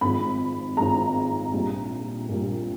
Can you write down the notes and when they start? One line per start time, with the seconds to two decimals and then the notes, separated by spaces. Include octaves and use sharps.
0.01 G#1 G#2 F3 G#3 B5
0.77 G#1 G#2 F3 G#3 A#5
1.54 A#1 A#2 G3
2.29 A#1 A#2 G3